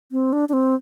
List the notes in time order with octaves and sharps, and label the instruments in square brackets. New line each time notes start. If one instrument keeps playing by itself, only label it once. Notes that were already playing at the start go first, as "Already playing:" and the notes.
[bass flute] C4
D4
D4
C4